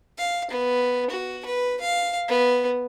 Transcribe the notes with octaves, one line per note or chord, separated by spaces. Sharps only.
F5
B3
F#4
B4
F5
B3